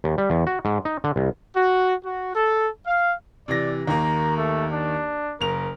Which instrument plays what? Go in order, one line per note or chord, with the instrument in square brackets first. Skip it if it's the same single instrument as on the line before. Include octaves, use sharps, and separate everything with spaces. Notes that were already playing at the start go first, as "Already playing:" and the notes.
[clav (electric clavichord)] D#2
G3
E2
F#4
G#2
D#4
D3
C2
[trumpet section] F#4
F#4
A4
F5
[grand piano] C3 E3 A#6 [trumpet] D5
[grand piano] D#2 D#3 A#3 [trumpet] A#5
[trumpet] A3
D4
[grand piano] F#1 F7 [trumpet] A#4